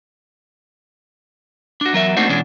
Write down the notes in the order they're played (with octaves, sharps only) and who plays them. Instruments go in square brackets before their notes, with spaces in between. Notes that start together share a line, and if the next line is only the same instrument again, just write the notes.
[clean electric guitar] D4 F#4
E2 F#3 A#4 E5
A3 A#3 C4 D4 D#4 F#4
B2 E3 G#3 C#4 D4